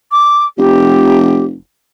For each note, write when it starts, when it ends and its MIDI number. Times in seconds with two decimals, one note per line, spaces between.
0.11 0.45 86
0.58 1.55 29
0.58 1.44 67